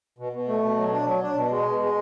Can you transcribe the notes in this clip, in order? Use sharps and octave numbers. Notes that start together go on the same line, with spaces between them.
B2
B2
A3
B2
F#3
D4
F#3
D4
B2
G#3
B2
G#3